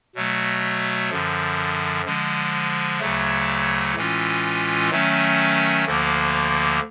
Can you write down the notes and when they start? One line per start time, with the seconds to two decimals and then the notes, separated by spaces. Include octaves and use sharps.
0.15 B2 F#3 A3
1.10 F#2 D3 F3
2.05 D3 F3 G#3
3.00 D2 C#3 F#3 A3
3.95 A2 E3 G#3 C#4 F4
4.90 D#3 F#3 A3 C#4
5.85 D2 D3 F3 A#3